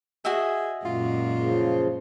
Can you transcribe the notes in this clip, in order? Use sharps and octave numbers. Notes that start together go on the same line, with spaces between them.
F#4 G#4 D#5 E5
F#2 A#2 G#3 F4
C#3 F3